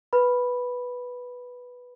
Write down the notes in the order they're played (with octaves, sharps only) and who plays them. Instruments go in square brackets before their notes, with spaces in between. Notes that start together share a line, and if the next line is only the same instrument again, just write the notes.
[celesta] B4 B5